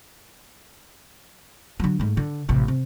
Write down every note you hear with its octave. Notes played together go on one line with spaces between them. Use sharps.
D3 F#3
G#2 A3
D3
A1 C3
C3